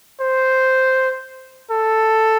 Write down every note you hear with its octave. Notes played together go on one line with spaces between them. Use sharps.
C5
A4